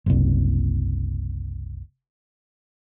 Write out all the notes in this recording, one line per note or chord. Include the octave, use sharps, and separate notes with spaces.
F#1 C2